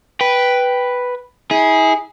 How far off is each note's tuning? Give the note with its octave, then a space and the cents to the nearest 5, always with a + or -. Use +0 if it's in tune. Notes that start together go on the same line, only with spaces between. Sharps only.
B4 +0 G5 +0
E4 -35 G#4 +0